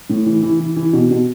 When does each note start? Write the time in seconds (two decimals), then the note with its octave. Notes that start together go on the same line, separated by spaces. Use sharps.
0.09 A2
0.26 E3
0.42 E3
0.60 E3
0.76 E3
0.93 B2
1.11 B2